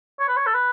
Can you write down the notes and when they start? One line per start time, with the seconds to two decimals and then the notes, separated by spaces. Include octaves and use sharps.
0.20 C#5
0.28 B4
0.37 C#5
0.47 A4
0.54 B4